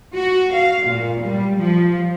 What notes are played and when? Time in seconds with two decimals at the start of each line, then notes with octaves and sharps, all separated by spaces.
0.15 F#4
0.56 F5
0.87 A#2
1.22 G3
1.57 F3